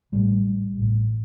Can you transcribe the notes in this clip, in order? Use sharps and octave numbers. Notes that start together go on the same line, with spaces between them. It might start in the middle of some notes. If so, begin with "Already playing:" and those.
A1 A2 G3
A1 A2